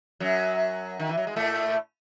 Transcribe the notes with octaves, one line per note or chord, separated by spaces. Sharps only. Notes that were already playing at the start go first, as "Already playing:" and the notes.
F#2 F#3
D#3
E3
F#3
G#3
A2 A3